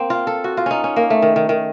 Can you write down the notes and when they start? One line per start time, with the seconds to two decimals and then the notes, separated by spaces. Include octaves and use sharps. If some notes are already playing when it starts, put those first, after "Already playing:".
Already playing: A#3 C4
0.10 F4
0.27 A4
0.44 F#4
0.57 F4
0.66 C#4 D#4
0.84 C#4
0.96 A#3
1.10 A3
1.22 D#3
1.36 D#3
1.49 D#3